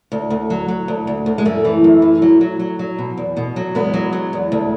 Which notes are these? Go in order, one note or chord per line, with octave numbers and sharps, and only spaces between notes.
D2
D2
F#3
F#3
D2
D2
D2
G#3
F#2 A3
E3
F#2
E3
F#3
F#3
F#3
F#3
B2
E2
B2
F#3
E2 G#3 B3
F#3
F#3
E2
D2